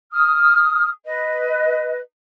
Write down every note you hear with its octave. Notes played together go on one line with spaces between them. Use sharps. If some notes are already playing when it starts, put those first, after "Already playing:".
D#6 F6
B4 D#5